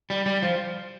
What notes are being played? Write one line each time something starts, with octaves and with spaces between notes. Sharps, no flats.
G3
G3
F3